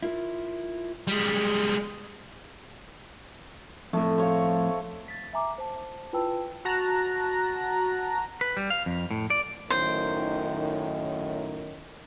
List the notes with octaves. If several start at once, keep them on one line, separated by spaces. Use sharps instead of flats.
E4 F4 A#4
G3 G#3
F2 A2 A3
C5 C#5 F5
A6 B6
E5 G#5 A#5 D6
C5 A5
E4 F4 B4 G5 A5 E6
F#4 A5 A#5 F#6 A#6
B4
G3
F5
F2
A2
D5
F#2 A2 D#3 C5